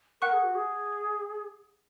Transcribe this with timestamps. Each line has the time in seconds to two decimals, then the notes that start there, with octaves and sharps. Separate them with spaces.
0.22 A#4 F#5 C#6 F#6
0.33 G#4
0.44 F#4
0.55 G#4